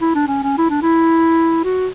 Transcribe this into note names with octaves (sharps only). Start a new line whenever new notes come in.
E4
D4
C#4
C#4
E4
D4
E4
F#4